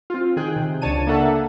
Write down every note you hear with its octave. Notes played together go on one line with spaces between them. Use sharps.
C4 F4
D#3 G#4 G5 F#6
C3
C#2 C#3 D4 C#5 A5 D#7
A#3 D4 A4 E5 F#5 A5